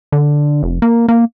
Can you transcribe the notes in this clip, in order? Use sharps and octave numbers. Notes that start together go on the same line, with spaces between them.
D3
F1
A#3
A#3